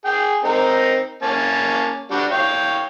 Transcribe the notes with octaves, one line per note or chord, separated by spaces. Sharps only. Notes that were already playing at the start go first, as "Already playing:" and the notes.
G#4 G5
C4 D#4 A#4
A#3 C#4 A5
G3 D4 F#4
C#5 F5 G5